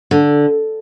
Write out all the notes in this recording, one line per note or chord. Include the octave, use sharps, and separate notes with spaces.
D3